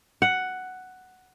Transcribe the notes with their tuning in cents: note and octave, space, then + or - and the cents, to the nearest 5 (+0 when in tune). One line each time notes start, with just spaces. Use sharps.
F#5 +5